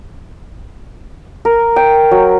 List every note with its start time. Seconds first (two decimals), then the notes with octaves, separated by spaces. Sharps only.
1.45 A#4
1.76 G5
2.11 F#3